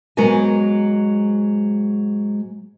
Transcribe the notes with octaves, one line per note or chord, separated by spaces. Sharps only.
G#2 F#3 G#3 B3 A#4 G#5